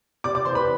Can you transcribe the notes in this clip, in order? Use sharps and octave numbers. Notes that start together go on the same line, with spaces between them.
C3 D5 D6
D5 D6
E3 C5 C6
B4 B5